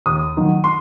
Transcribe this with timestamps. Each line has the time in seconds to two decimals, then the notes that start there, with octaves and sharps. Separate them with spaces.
0.06 D#2 D#6
0.37 D#3 F#3
0.64 C6